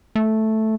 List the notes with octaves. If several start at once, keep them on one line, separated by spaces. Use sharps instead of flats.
A3